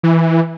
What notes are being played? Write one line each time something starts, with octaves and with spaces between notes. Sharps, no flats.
E3